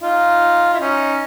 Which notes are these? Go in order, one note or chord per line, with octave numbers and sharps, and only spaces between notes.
D#4 F4
E4
C#4 D#4